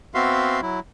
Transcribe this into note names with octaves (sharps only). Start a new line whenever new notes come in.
B3 C4 F#4 E5 F5 C6
F#3 E4